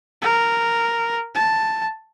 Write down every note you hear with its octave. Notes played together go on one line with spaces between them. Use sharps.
A#4
A5